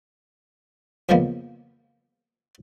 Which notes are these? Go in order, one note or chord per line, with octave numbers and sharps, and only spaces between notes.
F2 C#3 F3 G#3 A#3 B3